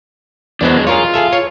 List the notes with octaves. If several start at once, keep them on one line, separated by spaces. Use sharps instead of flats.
E2 F#3 G#3 B3 D4 C5
F4 G#4 A#4 C#5
G#4 A4 E5
C#5